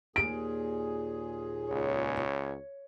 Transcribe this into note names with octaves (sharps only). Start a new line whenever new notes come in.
D#2 A#2 G#4 D7
C#2 C#5